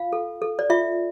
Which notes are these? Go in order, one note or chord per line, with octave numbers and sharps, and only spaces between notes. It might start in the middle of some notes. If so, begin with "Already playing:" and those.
Already playing: F4 F5
A4
A4
D5
F4 E5